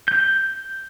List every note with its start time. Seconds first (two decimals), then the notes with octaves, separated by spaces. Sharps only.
0.08 G6